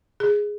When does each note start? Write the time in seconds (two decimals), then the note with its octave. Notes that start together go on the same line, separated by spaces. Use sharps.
0.20 G#4